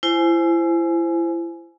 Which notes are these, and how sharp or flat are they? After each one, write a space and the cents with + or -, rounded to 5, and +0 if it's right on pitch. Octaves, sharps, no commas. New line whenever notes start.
E4 +30 C5 +0 G#5 +20